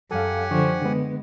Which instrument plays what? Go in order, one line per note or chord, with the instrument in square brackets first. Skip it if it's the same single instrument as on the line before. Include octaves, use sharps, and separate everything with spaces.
[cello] F#2 [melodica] G4 F#5 G#5 [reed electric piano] A4 F5
[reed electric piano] D3 C#6 [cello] F3
[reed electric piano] D3 B3 [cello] G#3